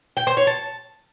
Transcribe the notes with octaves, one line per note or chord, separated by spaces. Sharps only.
G5
C5
C#5
A5